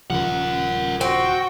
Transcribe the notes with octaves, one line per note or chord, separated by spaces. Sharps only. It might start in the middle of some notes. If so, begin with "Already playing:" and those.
D#1 C#3 F3 A#4 F#5
C4 F#4 G5